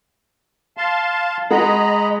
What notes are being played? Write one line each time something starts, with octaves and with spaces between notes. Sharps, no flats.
F5 A5 C6
G#3 D#5 F#5 A#5 B5